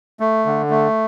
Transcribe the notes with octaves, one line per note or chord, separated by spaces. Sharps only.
A3
D3
A3